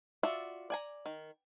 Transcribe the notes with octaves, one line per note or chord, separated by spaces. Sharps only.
F4 F#4 D5 E5
D5 G#5 A#5
D#3